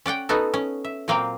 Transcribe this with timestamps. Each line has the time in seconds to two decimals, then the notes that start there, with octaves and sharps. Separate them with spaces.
0.06 C#4 D5 F#5 G5
0.29 B3 D#4 F#4 A4
0.54 C#4
0.84 E5
1.08 A#2 F#3 A#3 C4 F5 G5